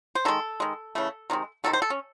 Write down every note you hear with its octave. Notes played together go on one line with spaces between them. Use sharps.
C5
D#3 G#3 A4
D#3 G#3
C#3 E3 A3
C3 D#3 G#3
C3 D#3 F#3 A3 A4
C5
A4
C#4